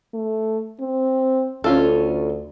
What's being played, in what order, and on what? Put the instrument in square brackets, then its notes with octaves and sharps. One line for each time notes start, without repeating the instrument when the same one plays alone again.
[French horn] A3
C4
[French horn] D2 [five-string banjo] C#4 F4 A4